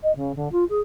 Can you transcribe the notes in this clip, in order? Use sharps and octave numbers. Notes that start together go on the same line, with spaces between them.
D#5
C#3
D3
F4
G#4